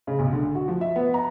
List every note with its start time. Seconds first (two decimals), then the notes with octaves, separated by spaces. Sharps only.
0.07 C#3
0.19 B1
0.33 D3
0.55 F#4
0.68 F3
0.81 E5
0.96 B3
1.14 A#5